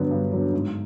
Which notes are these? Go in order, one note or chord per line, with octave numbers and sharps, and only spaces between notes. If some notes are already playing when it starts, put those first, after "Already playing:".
Already playing: G2 D3 F#3 B3
G2
D3 F#3 B3
G#2